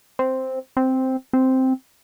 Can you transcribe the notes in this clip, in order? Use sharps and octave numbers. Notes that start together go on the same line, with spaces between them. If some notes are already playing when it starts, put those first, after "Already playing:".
C4
C4
C4